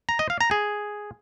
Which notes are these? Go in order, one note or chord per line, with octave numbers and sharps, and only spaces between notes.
A#5
D#5
F5
A#5
G#4